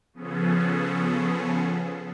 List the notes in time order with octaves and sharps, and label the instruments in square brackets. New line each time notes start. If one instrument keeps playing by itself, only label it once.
[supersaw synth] C#3 F3 B3 C#4 G#4 A4